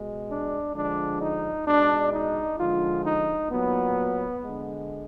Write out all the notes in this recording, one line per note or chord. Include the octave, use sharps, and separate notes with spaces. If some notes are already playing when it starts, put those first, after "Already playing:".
Already playing: B2 G#3
D4
D3 F3 G#3 D4
D#4
B2 G#3 D4
D#4
D3 F3 G#3 F4
D#4
A#2 F#3 B3
G#3
D3